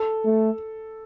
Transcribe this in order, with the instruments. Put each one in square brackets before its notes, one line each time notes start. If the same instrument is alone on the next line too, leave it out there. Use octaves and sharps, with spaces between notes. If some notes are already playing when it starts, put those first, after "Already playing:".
Already playing: [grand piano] A4
[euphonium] A3